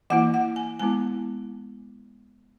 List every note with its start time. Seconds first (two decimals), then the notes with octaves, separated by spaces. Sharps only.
0.10 E3 A#3 E4 F#5
0.34 F#5
0.56 G#5
0.79 G#3 B3 E4 G#5